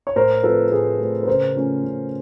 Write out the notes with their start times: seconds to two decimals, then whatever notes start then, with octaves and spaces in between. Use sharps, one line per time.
0.07 C#5
0.16 A2 A#4 C5
0.43 F3 A3 C4 A4 B4
0.71 A2 G#4 A#4
0.99 F3 A3 C4
1.23 B4
1.27 C#3 A#4 C5
1.55 F3 A3 C#4
1.83 C#3